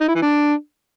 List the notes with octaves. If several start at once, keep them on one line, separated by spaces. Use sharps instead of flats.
D#4
E4
E3
D4